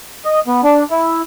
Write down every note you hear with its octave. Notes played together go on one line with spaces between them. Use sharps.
D#5
B3
D4
E4